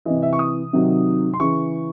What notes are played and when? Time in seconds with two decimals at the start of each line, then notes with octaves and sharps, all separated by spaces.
0.05 C3 E3 D#5
0.22 E5
0.33 C#6
0.39 D#6
0.73 C3 D#3 F#3
1.34 C6
1.40 C#3 E3 C#6